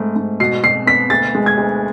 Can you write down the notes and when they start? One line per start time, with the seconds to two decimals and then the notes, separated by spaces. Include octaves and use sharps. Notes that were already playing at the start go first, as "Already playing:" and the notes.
Already playing: G#2 A3
0.16 G#2
0.40 B2 C7
0.64 B2 C7
0.87 B3 B6
1.10 D2 A6
1.35 G#3
1.46 G#6
1.57 D2